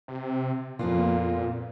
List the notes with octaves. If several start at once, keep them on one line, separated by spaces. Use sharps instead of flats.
C3
F2 A#2 B3 F4